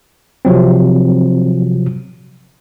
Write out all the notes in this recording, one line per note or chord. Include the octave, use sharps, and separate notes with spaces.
C3 F3 F#3 C4